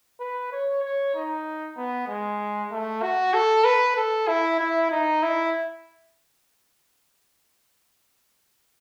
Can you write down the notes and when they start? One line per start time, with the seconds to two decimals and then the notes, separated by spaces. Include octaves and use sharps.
0.20 B4
0.52 C#5
0.83 C#5
1.14 D#4
1.78 B3
2.08 G#3
2.71 A3
3.02 F#4
3.34 A4
3.65 B4
3.97 A4
4.28 E4
4.59 E4
4.91 D#4
5.23 E4